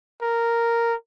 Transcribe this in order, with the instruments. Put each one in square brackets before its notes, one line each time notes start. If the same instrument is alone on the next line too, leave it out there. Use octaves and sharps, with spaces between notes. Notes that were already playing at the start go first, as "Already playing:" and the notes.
[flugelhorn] A#4